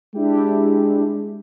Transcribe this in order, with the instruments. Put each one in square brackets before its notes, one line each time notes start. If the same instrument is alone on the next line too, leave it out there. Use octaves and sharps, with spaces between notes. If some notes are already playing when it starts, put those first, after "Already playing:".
[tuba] G#3 [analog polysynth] D4 E4 G4